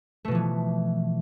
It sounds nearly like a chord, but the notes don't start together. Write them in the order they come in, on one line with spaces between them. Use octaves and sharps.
A3 B2 F3 E3